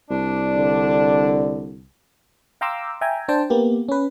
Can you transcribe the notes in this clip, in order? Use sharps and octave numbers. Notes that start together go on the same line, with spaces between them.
C2 D4 D5
D3
F5 G5 A#5 C6 D6 E6
E5 G5 G#5 A#5
D4 C5 G5 A5
A#3 B3 G4
C#4 B4